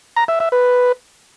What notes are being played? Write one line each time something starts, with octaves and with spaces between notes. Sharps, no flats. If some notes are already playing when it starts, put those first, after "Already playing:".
A#5
E5
E5
B4